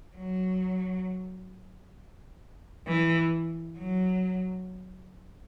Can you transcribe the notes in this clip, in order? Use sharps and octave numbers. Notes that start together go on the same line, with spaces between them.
F#3
E3
F#3